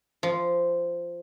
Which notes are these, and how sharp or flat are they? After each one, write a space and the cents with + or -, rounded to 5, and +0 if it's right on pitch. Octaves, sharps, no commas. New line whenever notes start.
F3 -10